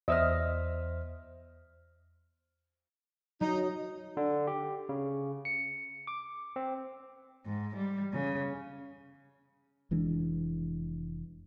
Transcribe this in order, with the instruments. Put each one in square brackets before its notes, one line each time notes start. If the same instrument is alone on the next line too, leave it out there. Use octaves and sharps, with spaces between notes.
[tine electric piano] E2 C5 F6 [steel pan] D#5 E5 E6
[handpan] F#3 [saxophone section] D#4
[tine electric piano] D3
G4
C#3
C#7
D6
C4
[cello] G#2
G3
C#3
[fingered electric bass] F1 E3 G#3 D4